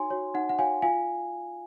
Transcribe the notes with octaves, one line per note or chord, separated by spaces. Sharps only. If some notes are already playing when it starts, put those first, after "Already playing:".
Already playing: D#4 F#4 C#5 G#5 C6
F#4 C#5
D#4 F#5
F#5
F#4 C#5 F5 G#5
F4 F5 G#5